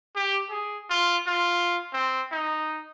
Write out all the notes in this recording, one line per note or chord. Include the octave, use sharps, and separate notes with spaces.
G4
G#4
F4
F4
C4
D#4